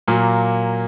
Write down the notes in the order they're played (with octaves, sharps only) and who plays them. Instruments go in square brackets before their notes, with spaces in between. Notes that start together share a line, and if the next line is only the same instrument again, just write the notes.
[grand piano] A#2 F#3 A#3